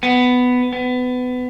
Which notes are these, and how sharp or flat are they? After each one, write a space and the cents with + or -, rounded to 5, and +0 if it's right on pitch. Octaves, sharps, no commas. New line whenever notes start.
B3 +10
B3 +25